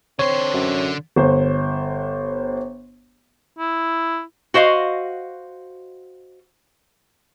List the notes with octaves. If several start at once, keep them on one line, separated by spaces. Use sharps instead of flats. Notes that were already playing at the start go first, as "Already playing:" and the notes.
D3 C4 C#5 C6
F#2
G1 C5
E4
F#4 C5 D#5 F5